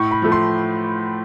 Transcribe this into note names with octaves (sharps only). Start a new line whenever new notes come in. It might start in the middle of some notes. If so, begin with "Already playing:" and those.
Already playing: A2 C#6
B5
F3 A3
C6